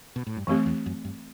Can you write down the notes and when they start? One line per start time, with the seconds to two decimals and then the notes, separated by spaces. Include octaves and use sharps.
0.16 B2
0.27 A2
0.37 G2
0.47 F#2 E3 A3 C4 G4
0.66 E2
0.86 F#2
1.05 G2